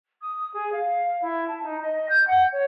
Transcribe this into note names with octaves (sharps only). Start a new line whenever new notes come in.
D#6
G#4
F5
E4
A5
D#4
D#5
G6
F#5
C#5